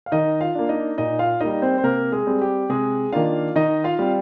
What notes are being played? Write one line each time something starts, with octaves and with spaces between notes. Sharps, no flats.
F5
D#3 D#4 D#5
F4 F5
A#3 D4
D#4 D#5
A#2 D#4 D#5
F4 F5
G3 A#3 D#4 D#5
C4 C5
C5
C3 A#3 A#4
G#3 G#4
G3 C4
G4
C3 G#3 G#4
D#3 A#3 D4 F4 F5
D#3 D#4 D#5
F4 F5
G3 C4